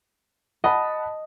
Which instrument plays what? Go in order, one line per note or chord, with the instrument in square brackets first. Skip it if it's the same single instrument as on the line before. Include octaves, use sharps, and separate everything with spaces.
[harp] D#5 [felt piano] F#5 A5 B5